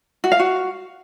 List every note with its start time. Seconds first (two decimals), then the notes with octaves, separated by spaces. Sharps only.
0.24 F#4
0.32 F5
0.39 F#4